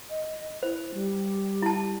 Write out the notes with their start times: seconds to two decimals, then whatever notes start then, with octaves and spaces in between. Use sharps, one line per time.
0.10 D#5
0.63 E4 C5
0.94 G3
1.62 E4 A5